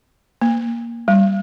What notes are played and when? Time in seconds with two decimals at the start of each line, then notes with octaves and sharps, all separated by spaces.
0.42 A#3
1.08 G3